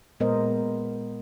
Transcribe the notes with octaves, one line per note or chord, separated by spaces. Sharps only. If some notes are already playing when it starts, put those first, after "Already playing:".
A#2 G#3 B3 A#4 C5 D#5